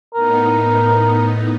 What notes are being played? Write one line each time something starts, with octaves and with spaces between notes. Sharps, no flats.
A2 B3 D#4 A#4